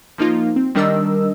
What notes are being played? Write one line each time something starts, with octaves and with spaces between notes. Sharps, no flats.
F3 A#3 D#4 F4
C4
D#3 G3 D4 A#4 D#5 E6